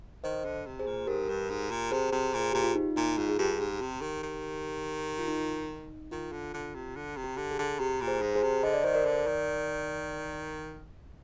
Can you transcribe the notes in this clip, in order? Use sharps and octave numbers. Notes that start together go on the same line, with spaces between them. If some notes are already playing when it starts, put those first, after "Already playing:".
D#3 C5 D#5
D3
C3
G#4 C5
A#2
G#2 G4 A#4
G2
G#2
A#2
C3 G#4 C5
C3
A#2
G#4
A#2 G4
F4
D#4
A#2 D#4
G#2 F4
G#4
G2 G4
G#2
C3
D#3
D#3
F4
D#4
D#3 F4
D3
D3
C3
D3
C3
G4
D3
G#4
D3
C3 G4
A#2
G#4 C5
G#2
G#4 C5
C3
D3 D#5
D5
D#3 C5
A#4 D5
D3
D#3